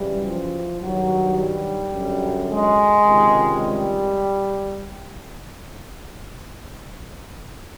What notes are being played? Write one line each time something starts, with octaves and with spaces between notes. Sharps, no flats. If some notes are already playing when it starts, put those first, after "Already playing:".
Already playing: F#2 C#3 E3 G3
F3
G2 D#3 F#3
G3
F#2 D3
G#3
C#2 C3 D#3
G3